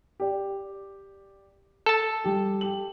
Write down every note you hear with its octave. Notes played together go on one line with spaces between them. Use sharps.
G4 D5
A4 A5
G3 G4
G4 F#7